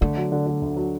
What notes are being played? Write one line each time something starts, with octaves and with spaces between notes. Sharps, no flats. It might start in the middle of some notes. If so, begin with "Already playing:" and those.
D3 A3
F#3
D3
D3
D2
F#3